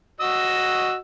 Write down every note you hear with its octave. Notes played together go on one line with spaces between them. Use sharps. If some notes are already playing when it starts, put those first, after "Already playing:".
F#4 D#5 E6